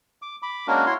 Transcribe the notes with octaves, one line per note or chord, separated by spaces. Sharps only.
D6
B5 D6
G#3 A#3 C#4 D4 F#4 A#4
E4 F#4 C#5 C6